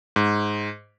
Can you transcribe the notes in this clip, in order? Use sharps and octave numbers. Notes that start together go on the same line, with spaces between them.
G#2